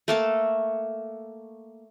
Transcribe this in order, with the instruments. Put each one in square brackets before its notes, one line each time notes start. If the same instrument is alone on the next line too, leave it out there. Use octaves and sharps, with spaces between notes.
[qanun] A3 A#3 A4